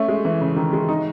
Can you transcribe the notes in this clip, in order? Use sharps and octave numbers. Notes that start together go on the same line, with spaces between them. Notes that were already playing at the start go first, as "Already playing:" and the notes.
Already playing: A3 C#4
G#3
E3
C#3
D#3
G#3
D#4